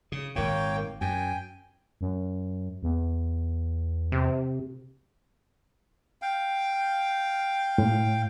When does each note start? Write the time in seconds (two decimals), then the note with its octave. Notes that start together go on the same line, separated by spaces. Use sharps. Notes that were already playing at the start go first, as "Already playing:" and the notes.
0.12 C#3 D#6
0.36 G#1 A#2 A#3 C#5 G5
1.01 F#2 G5 G#5
2.01 F#2
2.83 E2
4.12 C3
6.22 F5 G5
7.78 A2